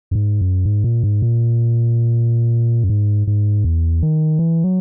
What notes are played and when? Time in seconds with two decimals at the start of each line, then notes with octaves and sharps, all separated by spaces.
0.11 F#2
0.15 G#2
0.41 F#2
0.65 G#2
0.84 A#2
1.03 G#2
1.22 A#2
2.83 F#2
2.90 G#2
3.27 G#2
3.64 E2
4.02 D#3
4.39 E3
4.64 F#3